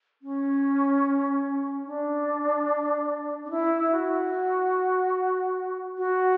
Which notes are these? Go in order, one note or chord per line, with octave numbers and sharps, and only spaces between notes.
C#4
D4
D4
E4
F#4
F#4